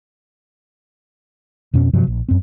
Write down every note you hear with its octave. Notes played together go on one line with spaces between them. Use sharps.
F2 B2 C#4
G2 C3 F3 F#3
A#1
F#2 C4